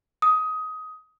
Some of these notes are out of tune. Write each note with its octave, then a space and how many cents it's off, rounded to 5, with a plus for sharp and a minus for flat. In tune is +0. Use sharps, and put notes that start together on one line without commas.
D#6 +15